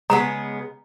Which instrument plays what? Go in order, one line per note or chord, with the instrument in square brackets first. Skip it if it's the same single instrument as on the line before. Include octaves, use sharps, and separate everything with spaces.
[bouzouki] C#3 G#3 B3 [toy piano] A#5